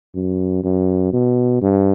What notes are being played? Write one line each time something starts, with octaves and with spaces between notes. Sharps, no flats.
F#2
F#2
B2
G2